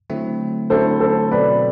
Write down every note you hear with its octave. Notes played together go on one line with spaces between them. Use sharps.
D3 F#3 A3 C4 E4
D3 F#3 A3 C4 E4 A4 C5
A4 C5
B2 F#3 C4 B4 D5